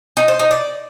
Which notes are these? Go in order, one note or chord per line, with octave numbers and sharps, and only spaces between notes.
D#4
C5
D#4
D5